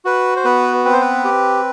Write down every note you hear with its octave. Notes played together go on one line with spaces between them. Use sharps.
F#4 B4
C5
B3 B4
C4 B4
C5
B4
G4